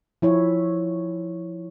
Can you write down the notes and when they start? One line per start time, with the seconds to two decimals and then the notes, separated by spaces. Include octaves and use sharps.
0.22 F3 E4 C#5